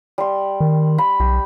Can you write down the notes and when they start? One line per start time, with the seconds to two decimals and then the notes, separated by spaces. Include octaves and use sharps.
0.18 G3 C6
0.61 D#3
0.98 B5
1.20 B1 G4